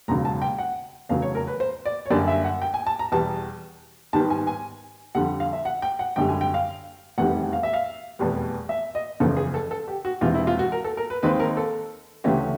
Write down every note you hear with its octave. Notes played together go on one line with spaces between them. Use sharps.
E1 D#2 C#3 F#3 A#5
A5
G5
F#5
F1 E2 C#3 F#3 F5
C#5
A#4
B4
C5
D5
C#5
F#2 D3 G3 A#3 D4 D5
E5
F#5
G5
G#5
A5
A#5
E2 B2 G3 A5
G#2 D#3 G3 B3 A5
G#5
G#5
F2 D3 G3 F#5
F5
E5
F#5
G5
F#5
G#1 F#2 D3 G3 G5
G#5
G5
F5
F1 E2 C3 D#3 G3 F#5
F#5
F5
E5
F5
F1 E2 B2 G3 B3
E5
D#5
F#1 E2 C#3 F3 A4
G#4
A4
A4
G4
F#4
E1 E2 C3 E3 F4
E4
F4
F#4
A#4
A4
A#4
B4
D#2 D#3 G#3 C4 D#4 B4
A#4
A4
D2 C#3 E3 A3 C#4 G4